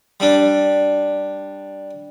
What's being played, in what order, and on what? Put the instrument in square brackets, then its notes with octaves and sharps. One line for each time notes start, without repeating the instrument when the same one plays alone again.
[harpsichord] G3 D4